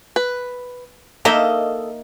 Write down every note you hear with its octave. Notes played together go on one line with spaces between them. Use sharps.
B4
A#3 D#4 A4 D#5 E5